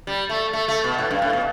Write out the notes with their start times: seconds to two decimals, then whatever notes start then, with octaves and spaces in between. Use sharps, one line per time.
0.07 G3
0.29 A3
0.53 A3
0.68 A3
0.84 B2
0.98 A2
1.11 G2
1.22 A2
1.33 B2